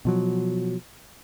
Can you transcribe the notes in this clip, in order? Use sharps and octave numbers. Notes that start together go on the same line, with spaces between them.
B2 F3 F#3